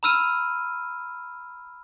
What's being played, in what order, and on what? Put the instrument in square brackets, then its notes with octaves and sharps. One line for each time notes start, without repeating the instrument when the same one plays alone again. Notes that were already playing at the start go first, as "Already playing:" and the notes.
[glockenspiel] A#5 B5 E6 F6 D#7